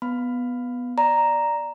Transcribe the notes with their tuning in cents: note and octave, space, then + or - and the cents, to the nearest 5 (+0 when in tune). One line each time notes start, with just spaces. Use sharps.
B3 +0 B5 +15
D5 +5 A#5 +0